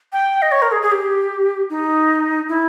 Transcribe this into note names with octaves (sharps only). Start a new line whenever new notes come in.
G5
D#5
C#5
A#4
G#4
G#4
G4
D#4
E4